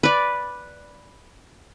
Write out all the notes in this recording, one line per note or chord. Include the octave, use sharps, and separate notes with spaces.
B4 D5